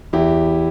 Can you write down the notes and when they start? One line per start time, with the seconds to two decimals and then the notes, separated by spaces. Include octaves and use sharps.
0.13 E2 E4 G4